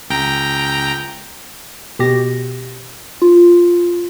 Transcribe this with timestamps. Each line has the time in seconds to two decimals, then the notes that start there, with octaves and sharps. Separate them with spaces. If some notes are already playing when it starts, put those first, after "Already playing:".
0.10 C#2 G5 A#5
1.99 B2 G4 A#6
3.22 F4